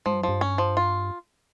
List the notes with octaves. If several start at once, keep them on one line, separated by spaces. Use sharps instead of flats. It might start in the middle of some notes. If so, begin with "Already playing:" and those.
G#2 F3
G2
F#2 F3
G2
C#4
F3
F4